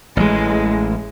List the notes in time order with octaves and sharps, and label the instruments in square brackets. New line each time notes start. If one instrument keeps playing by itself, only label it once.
[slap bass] A1 E3 [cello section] G#3